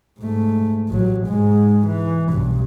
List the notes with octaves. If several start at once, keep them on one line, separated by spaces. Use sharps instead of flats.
G#2 A3
A1 F#3
G#2 G#3
E3
B1 G2